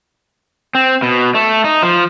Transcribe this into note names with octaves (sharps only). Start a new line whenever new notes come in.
C4
B2
A3
D#4
F3